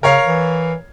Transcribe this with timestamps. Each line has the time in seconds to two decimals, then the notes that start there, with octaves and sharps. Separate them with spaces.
0.03 C#3 A#4 C#5 F5
0.26 E3